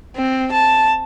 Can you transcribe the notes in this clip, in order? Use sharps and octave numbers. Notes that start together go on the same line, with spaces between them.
C4
A5